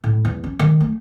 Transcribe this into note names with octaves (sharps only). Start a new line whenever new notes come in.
A2
E2
C#4
D#3
A3